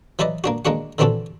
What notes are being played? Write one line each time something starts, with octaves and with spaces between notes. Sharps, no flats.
E3 F#3 E4 B4 D5 D#5
A#3 D4 F#4
G#3 A#3 D4 F#4 F#5
D3 E3 C4 D4 F#4 A4